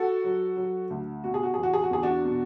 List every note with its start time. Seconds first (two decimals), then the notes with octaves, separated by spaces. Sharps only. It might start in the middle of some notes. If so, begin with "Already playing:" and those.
Already playing: F#4 A4
0.24 F#3
0.57 F#3
0.90 D2
1.24 B2 F#4
1.34 G#4
1.43 F#4
1.54 E2 G#4
1.63 F#4
1.73 G#4
1.84 F#4
1.91 E2 G#4
2.03 D4 F#4
2.25 B2